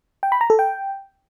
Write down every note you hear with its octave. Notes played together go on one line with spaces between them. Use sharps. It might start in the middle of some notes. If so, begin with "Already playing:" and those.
G5
B5
A#5
A4
G5